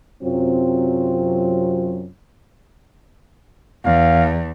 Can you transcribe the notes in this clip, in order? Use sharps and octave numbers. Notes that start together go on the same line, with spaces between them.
F#2 C3 F#3 C4 F4
E2 F5